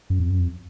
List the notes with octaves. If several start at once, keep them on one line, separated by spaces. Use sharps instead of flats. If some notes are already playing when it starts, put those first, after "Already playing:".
F#2
F2
F#2
F2